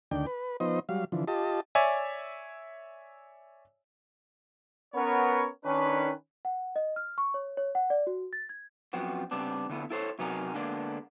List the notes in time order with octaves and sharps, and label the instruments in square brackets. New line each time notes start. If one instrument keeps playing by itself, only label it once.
[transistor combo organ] D2 D#3 D4 G5
B4
F3 B3 D#4 C5 D#5
F#3 G3 F5
D3 E3 F3
F4 G4 D#5 A5
[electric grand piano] C#5 D5 E5 G#5
[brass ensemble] B3 C#4 A#4 C#5
D#3 C#4 D4 B4
[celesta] F#5
D#5
F6
C#6
C#5
C#5
F#5
D5
F#4
A6
G#6
[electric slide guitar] F#2 F3 B3 C4 F#4
C#3 G3 B3 C4 D4
D3 A3 B3 E4
E4 A4 C5 C#5
C3 F#3 B3 D#4 G#4 A#4
D3 G#3 A#3 B3 D4